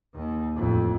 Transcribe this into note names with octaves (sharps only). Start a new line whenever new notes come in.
D#2 D#3
A1 F2